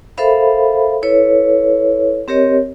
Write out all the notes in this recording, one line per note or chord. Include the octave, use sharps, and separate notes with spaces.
A4 A#4 C5 E5 F5 B5
E4 A4 B4 C#5
C4 G4 A#4 C#5 D#5